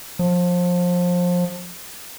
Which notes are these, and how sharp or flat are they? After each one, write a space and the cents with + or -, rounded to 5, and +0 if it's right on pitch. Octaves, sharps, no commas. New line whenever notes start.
F3 +25